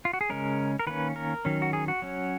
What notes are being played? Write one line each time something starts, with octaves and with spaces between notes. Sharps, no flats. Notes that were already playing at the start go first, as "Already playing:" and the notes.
F4
F#4
G#4
C#3 G#3 C#4 A#4
A#4
D#3 A#3 C#4 B4
A#4
D#3 F#3 C#4
F#4
G#4
F#4
F#3 C#4